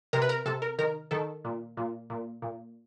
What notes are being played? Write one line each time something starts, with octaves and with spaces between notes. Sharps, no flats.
C3 A#4
B4
A#4
C3 A4
A#4
D#3 A#4
D#3 A4
A#2
A#2
A#2
A#2